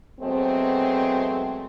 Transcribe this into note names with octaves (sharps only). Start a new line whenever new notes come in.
B2 F#3 G#3 A3 C4